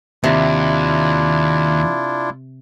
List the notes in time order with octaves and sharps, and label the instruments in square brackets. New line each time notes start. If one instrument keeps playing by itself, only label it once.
[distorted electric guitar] D#2 [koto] C3 [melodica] D4 E4 F4